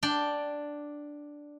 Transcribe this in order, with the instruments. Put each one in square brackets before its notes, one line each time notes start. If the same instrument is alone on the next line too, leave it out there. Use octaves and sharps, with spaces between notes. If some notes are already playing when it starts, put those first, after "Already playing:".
[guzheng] D4 D5 G5